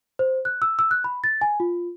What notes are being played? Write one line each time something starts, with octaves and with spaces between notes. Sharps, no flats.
C5
F#6
E6
E6
F#6
B5
A6
G#5
F4